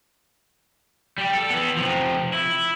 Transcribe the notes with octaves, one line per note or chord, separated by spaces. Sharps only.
G3 G4
A4
E3 B3
C3 F3
E4